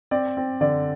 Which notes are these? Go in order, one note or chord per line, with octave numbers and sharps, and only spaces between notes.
C4 D5
C4
D3 D5